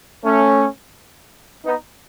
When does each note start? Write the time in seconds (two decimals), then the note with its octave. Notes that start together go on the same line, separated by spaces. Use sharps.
0.24 A3 C#4
1.65 B3 D#4